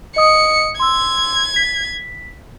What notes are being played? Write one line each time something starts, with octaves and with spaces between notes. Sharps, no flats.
D#5 D#6 C#7
C6 E6 G#6
B6